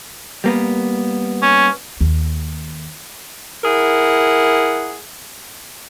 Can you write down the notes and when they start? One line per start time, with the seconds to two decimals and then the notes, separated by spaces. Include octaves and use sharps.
0.44 G3 A#3 B3
1.42 C#4
2.01 D#2
3.64 E4 G#4 A#4 F#5